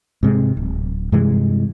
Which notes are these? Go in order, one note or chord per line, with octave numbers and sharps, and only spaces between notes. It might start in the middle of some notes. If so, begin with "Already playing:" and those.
G#2 C3 G#3
D1
G2 C3 E3 G#3